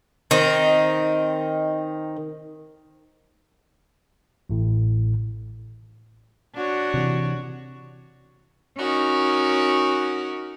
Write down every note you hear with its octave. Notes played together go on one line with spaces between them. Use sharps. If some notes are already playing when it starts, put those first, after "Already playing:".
D#3 C4 D#4
A1 A2
D4 F#4 C#5
C3 E3
C#4 D#4 F#4 A#4